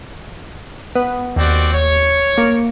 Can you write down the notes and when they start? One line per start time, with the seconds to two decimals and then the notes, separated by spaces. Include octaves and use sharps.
0.95 B3
1.36 D#2 C4 F#4 D5
1.73 C#5
2.38 A#3